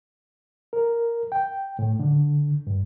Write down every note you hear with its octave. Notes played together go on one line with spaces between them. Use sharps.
A#4
G5
A2
D3
G2